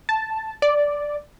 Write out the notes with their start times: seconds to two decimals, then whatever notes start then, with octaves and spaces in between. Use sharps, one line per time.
0.09 A5
0.62 D5